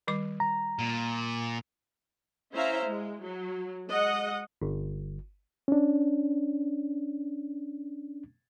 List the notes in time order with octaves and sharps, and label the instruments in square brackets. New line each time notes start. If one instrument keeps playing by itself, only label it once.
[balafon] D#3 G3 D6
[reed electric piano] A#5
[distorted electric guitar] A#2
[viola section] C#4 E4 C5 E5 F5 A#5
G#3
F#3
G#3 D#5 F#5
[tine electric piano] G1
[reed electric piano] C#4 D4